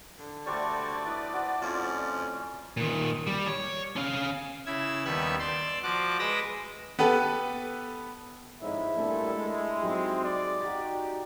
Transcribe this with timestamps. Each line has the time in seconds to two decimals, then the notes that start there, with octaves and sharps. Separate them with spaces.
0.19 D3
0.46 G3 A3 F#4 C5 D5 C#6
1.06 E4 B4 D#5
1.33 F#4 B4 C5
1.62 F2 C#4 F4 C#6
2.77 A#2 D#3
3.27 G3
3.48 C#5
3.96 C#4 F5
4.66 C#3 E4 E6 G#6
5.05 D#2 G3 B3 E6 F#6 G#6
5.39 D5 C6 E6
5.83 F3 F#4 D6 F#6
6.19 G#3 B4 B5 D6 E6 A#6
6.99 B3 G4 A4 B4
8.62 F2 G#2 E4 C#5 D#5 E5
8.96 A#2 G3 A3 D4 A4
9.34 G#3
9.82 F#3 C4 D#4 G4
10.24 D5
10.61 D#4 F#4 G4 A6